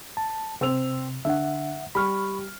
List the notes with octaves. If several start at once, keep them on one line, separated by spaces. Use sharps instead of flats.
A5
C3 C4 E6 F7
D3 E5 F#5
G3 B5 C#6 F6